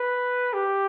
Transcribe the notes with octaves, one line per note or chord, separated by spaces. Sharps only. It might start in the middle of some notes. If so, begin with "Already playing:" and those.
Already playing: B4
G4